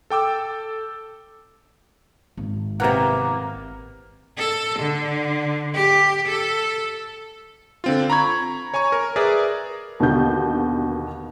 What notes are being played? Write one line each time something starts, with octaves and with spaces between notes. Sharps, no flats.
A4 G5 D6 E6
G#1
C3 E3 A#3 B3 A#4 F#5
A4
D3
G4
A4
D3 C4 F4
A#5 B5 C#6 G#6
C#5 G#5 A#5 C#6
A#4
G#4 A#4 B4 D5 E5
D#2 B2 D3 G6